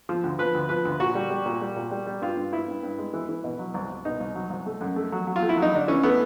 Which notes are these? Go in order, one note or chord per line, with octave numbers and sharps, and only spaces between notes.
F3
D2
F3 B4
D2
F3 B4
D2
A#2 F#4
G3
G3
A#2
G3
A#2
G3
G3
G2 F4
G2
G2 E4
G2
G2
G#3
E3
E3
B2
F#3
C2
C2
B2 D#4
C2
F#3
C2
A3
F#2
A3
F#3
F#3
F4
A3
E4
F#3
D#4
D3 D4
E3 C#4
A3 B3